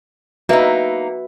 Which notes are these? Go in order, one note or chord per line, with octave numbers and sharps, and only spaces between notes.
A#3 D#4 F#4 B4 E5